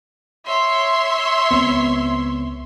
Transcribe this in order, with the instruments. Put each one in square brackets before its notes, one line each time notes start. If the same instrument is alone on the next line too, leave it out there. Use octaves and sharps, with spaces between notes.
[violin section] C#5 E5 C6
[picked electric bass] C#2 B3 C4